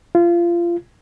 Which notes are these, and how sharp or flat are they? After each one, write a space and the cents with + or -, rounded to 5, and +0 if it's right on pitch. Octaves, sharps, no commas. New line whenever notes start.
F4 -25